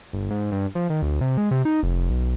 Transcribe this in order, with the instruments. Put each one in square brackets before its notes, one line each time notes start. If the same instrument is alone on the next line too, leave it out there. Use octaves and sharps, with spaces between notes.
[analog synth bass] G1
G#2
G2
F3
D#3
D2
C3
G#3
C3
D#4
F1
B1